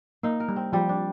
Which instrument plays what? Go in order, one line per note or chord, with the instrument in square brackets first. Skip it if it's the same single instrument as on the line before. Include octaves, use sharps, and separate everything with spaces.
[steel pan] A#3 [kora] D#4
[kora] A#4
[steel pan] G3
[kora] C4
[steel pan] F3 [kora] G3
[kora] D4